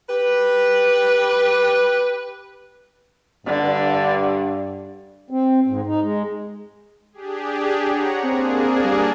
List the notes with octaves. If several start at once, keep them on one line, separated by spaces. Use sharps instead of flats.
G4 B4
G2 D3
C4
G#2
D#4
G#3
D4 G4 G#4
C#5 F#5 A#5
A#3 C4 D4 G#4
G3